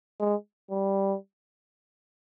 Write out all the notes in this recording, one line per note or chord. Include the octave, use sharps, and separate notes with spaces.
G#3
G3